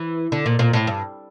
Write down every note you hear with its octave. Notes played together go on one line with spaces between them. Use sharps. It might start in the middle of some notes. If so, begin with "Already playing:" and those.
Already playing: E3
D3
A#2
A#2
A2
G2